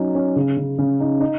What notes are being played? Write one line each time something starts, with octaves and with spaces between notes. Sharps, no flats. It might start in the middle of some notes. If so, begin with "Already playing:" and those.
Already playing: F#3 C#4 D#4
C#4
C#3
C#3
C#3
D#4
D#4